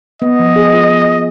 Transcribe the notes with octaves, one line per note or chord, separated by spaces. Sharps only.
B3 D#5
F3
G#4
F4
B3
F3